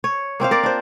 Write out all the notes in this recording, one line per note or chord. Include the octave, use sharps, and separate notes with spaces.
C#5
A#3 C4 C5 F5
A#4 D5
D4 F4 C5